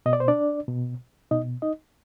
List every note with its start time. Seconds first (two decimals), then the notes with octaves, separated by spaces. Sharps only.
0.06 B2 D#5
0.13 D5
0.20 C5
0.28 D4 D5
0.68 B2
1.31 B2 D#4 D#5
1.62 D#4 D#5